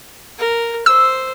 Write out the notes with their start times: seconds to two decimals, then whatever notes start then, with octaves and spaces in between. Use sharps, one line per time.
0.38 A#4
0.86 C5 E6